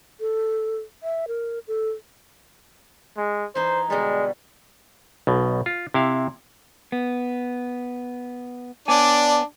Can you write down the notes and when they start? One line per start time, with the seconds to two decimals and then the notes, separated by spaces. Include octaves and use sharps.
0.20 A4
1.03 E5
1.28 A#4
1.68 A4
3.17 G#3
3.55 E3 D#4 C5
3.90 B2 D3 G3 G#3
5.27 B1 B2
5.66 F4
5.94 C3 E4 F5
6.92 B3
8.88 B3 D4 C#5 D5 G#5